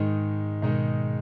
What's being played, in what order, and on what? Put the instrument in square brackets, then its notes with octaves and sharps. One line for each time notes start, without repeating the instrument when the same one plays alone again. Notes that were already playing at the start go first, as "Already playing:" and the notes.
Already playing: [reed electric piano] G#2 [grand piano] D#3 G#3 D#4
[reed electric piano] B2 [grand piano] D#3 G#3 D#4